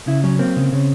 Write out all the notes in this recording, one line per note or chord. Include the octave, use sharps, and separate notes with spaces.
C#3 E4
F#3 C#4
A#3 C4
C#3
C#3